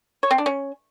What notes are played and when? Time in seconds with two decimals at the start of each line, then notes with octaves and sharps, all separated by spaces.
0.23 C#5
0.31 C4
0.38 D4
0.46 C#4